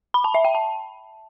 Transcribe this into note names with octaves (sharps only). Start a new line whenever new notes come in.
B5
A5
E5
G5
A5